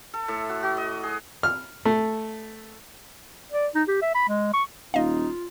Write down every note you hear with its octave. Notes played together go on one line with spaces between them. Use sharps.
A4
A2
F#4
F#4
D#5
G#4
F6
A3
D5
D#4
G4
E5
B5
G#3
C#6
D#1 D#4 F4 D#5 F5